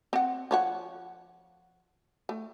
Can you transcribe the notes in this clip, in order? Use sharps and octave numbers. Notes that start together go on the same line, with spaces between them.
C4 F#5
F3 C#5 F#5
A3